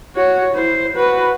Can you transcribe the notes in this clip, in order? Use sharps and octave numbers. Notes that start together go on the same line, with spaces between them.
F#4 C#5
E4 C5
F#4 B4